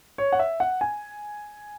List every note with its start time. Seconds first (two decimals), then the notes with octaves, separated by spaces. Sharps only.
0.18 C#5
0.32 F#5
0.39 E5
0.60 F#5
0.81 G#5